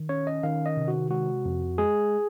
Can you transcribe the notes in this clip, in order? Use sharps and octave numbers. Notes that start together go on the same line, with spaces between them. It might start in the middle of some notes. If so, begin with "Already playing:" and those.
Already playing: D#3
C#4 C#5
D#5
D#3 F5
D#5
C3
F#4
G#3 F#4
F2
G#3 G#4